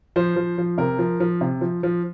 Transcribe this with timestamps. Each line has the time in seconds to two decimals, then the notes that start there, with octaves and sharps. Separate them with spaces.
0.16 F3 C5
0.36 F3
0.58 F3
0.78 C3 A#4
0.99 F3
1.20 F3
1.41 C3
1.61 F3
1.83 F3